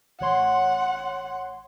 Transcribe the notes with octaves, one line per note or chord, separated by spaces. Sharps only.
A1 C#5 F#5 C6